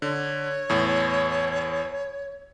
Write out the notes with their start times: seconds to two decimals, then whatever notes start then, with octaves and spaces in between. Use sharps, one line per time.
0.02 D3 C#5
0.70 E2 A2